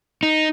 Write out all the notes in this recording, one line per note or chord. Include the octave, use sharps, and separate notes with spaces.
D#4